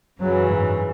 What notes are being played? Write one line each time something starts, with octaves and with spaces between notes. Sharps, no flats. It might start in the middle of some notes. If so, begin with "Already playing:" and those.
F#2 C#3 E3 F#3
G#2